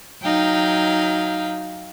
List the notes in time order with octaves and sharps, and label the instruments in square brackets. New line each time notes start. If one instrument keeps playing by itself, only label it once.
[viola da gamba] F#3 D#4 [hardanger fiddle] F5 G5